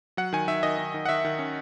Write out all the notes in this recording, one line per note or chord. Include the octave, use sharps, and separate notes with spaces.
F#3 F#5
D#3 G#5
D#3 E5
D#3 D#5
D#3
D#3
F#5
D#3 E5
D#3
C#4